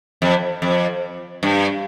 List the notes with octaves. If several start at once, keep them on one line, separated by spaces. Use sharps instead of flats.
F2
F2
G2